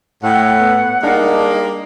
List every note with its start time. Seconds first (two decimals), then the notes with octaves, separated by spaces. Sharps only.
0.24 A2 F#5 G5
0.58 B3
1.03 G3 G#3 A#3 D4 D#4